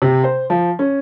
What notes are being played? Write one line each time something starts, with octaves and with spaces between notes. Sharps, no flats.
C3
C5
F3
C#4